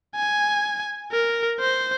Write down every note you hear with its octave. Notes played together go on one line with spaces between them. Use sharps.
G#5
A#4
C5